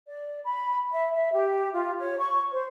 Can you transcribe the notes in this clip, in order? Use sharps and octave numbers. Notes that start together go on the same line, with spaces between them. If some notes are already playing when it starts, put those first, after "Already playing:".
D5
B5
E5
E5
G4
F4
C#5
C#6
C5